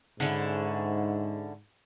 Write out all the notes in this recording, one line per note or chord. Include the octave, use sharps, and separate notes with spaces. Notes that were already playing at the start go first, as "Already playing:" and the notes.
G#2 D3 C#4 E4